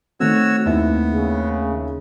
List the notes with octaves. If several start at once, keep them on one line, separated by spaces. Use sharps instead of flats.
D#3 A3 C4 F#4 C#5 E6
D#2 B3 E4 E5
C#3